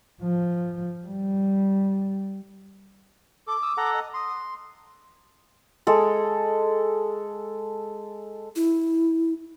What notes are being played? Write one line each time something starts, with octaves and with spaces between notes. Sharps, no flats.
F3
G3
A4 D6
D#6 E6
A4 F#5 A#5
D#5
C6 D#6
G#3 A4
E4